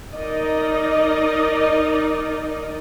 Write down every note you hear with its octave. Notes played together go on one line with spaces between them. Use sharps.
D#4 A#4 D5 D#5